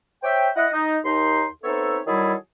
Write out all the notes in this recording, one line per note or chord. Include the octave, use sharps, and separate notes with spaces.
C5 C#5 E5 G5
E4 D#5 F#5
D#4
D#2 D#4 C6
B3 C4 D#4 A4 C#5 E5
D#3 F#3 G3 E4 G#4 A4